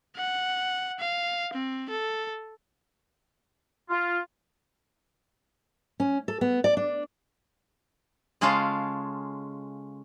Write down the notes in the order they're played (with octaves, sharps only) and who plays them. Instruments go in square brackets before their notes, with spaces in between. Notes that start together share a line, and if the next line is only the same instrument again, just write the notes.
[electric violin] F#5
F5
C4
A4
[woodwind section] F4
[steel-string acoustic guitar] C#4
A4
B3
D5
D4
[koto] C#3 G#3 C#4 F4 A4 F5